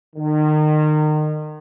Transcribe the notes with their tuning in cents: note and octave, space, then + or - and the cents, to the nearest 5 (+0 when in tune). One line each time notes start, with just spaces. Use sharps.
D#3 -30